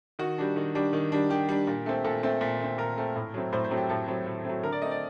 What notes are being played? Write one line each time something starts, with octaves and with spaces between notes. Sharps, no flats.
D#3 F#4
G3 D4
D#3
G3 D4
D#3
G3 D4
D#3 G4
G3 D4
A#2
A3 C4
A#2 A4
A3 C4
A#2
A3 C4
A#2 A#4
A3 C4
A2
F#3 A3 C4
A2 C5
C5
F#3 A3 C4
G4
A2 A4
F#3 A3 C4
A2
F#3 A3 C4
D3 A#4
D5
A3 C4 D#5
D5